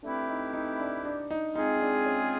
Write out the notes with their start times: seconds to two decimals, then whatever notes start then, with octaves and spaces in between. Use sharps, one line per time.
0.03 A3 C4 D4 E4 G4 B4
0.29 D#4
0.53 D#4
0.79 D4
1.05 D4
1.31 D#4
1.56 G#3 C4 D#4 F4 G#4
1.81 D4
2.06 C#4